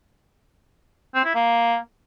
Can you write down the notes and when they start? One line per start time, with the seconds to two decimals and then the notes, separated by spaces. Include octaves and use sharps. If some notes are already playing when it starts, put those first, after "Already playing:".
1.15 C4
1.25 E4
1.35 A#3